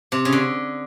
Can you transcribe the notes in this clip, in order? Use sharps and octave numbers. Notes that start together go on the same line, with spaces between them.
C3
C#3
D3